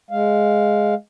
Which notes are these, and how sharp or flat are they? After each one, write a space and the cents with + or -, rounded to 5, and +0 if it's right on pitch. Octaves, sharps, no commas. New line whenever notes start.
G#3 +5 F5 +0